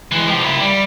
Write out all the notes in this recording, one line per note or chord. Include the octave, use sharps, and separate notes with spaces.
E3 G#3
F3 G4
A#3 E4
G3